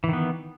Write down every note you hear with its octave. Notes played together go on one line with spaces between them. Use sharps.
D#3 E3 B3